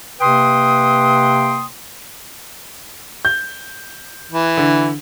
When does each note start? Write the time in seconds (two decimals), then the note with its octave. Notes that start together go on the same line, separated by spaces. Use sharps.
0.21 C3 A#3 B4 G5 C6 D#6
3.25 G6
4.32 E3
4.57 D3